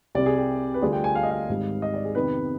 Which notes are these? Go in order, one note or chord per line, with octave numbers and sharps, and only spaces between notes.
C2 C3 G3 D5
G#4
G4
B4
D2 D3 G3 D4 F4 G#4
G5
G#5
F5
D#5
F5
G#1 G#2 D#3 G3
D#5
D5
G#4
F2 C3 D#3 B3 D#4 B4